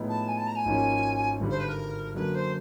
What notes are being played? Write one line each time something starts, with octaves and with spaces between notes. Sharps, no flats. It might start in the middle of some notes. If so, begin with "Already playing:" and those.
Already playing: A2 F3 G#3 B3 D#4
A5
G#5
A5
A#5
G#5
G#1 G#2 F3 A#3 C#4
G#1 G2 D3 G3
C5
B4
A#4
F#2 D3 F#3 A#3 B4
C5